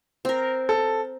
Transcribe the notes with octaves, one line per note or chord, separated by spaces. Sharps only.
C4 A#4
A4